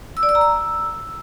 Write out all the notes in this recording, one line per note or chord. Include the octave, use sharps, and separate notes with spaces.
E6
D5
E6
A#5
E6